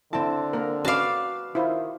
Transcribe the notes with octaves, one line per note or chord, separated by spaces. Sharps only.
D3 C4 E4 A5
A#3 A#4
C#4 F#4 B4 D5 F5 A5
D#3 E4 F4 C5